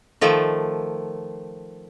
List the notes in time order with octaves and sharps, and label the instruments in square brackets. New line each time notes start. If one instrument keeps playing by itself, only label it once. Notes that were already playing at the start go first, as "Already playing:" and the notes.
[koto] D#3 F3 A3